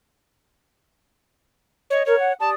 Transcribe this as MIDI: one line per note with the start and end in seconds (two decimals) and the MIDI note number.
1.90 2.06 73
1.90 2.02 75
2.06 2.14 70
2.06 2.33 73
2.18 2.32 78
2.40 2.54 67
2.40 2.54 74
2.40 2.49 81
2.40 2.54 87